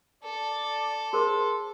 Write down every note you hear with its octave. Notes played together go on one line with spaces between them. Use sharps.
A4 D5
G#4 A#4 C5 C6